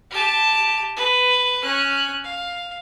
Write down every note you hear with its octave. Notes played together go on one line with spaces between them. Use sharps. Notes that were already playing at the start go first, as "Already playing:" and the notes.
G4 A5
B4
C#4 F#6
F5